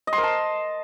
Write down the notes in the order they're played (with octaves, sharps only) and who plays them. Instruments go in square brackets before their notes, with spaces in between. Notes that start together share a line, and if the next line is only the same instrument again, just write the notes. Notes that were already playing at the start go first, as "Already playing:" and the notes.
[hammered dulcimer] D#5
C6
A#4
A5